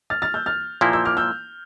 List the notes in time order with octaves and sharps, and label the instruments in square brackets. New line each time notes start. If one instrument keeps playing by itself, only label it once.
[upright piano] F6 A6
F6 A6
E6 G6
F6 A6
[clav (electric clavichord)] A#2 F3 A#3 E4 [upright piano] E6 G6
[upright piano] E6 G6
D6 F6
E6 G6